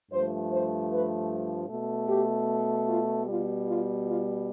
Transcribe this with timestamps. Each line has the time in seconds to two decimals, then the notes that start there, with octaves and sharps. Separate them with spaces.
0.11 G2 F3 A3 C5
0.51 C5
0.91 B4
1.70 B2 A3
2.08 G4
2.87 F4
3.26 B2 G3 F4
3.66 F4
4.05 F4